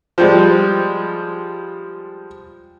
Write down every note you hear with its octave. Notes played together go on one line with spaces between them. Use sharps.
F3 G3 G#3